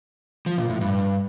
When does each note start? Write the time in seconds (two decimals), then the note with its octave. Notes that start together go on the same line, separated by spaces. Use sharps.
0.46 F3
0.58 A#2
0.69 A2
0.81 G2